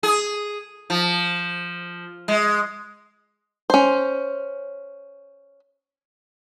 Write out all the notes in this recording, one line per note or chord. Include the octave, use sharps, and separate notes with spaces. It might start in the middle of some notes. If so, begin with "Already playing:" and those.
G#4
F3
G#3
C#4 C5